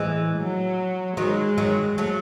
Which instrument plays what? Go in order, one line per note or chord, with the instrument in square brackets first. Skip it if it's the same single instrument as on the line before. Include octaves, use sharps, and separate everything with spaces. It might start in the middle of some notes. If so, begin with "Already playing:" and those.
Already playing: [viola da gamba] A2 [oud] E3 G#3
[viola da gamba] F#3
[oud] D#3 F#3 [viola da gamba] G#3
[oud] D#3 F#3
F#3 A3